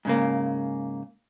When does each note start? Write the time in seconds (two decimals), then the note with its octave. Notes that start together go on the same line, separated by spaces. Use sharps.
0.05 G#2 C#3 A#3